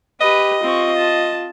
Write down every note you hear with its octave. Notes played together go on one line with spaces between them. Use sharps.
G4 B4 D#5
C4 F4 C#6
A5